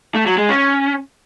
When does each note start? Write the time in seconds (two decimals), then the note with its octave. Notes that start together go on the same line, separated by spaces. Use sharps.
0.15 A3
0.26 F#3
0.38 G#3
0.49 C#4